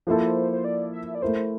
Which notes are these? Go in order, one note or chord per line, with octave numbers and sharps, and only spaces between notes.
F3 A#3 E4 A4 C5
C5
D5
E5
D5
A3 E4 A#4 C5